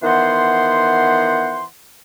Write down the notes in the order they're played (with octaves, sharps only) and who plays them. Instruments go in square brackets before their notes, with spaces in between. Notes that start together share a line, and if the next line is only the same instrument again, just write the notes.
[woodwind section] D#3 E3 B3 C5 F#5 C6